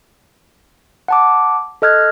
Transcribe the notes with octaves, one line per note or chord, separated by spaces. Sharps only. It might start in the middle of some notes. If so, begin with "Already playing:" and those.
F#5 A5 D6
A4 D#5 F6 F#6 G#6